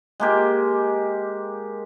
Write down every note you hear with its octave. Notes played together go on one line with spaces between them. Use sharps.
G#3 A#3 G4